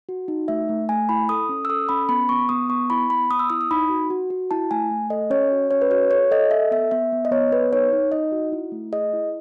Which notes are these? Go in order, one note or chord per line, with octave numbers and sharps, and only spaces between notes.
F#4
D#4
A3 E5
A3
A3 G#5
E4 B5
A4 D#6
C#4
E6
A4 D#6
C#4 B5
B3 B5
B3 C#6
B3 D#6
B3 C#6
E4 B5
B3 B5
B3 D#6
E6
E4 D#6
D#6
D#4 B5
F#4
F#4
F#4
E4 A5
A3 G#5
A3
A4 D#5
C#4 C#5
F#4
C#4 C#5
B4
F#4 C#5
A4 C#5
A4 D#5
A4 E5
B3 E5
B3 E5
B3
D#5
B3 C#5
B3 B4
D#4 C#5
D#4
D#4 D#5
F#4
E4
A3
G#4 D#5
E4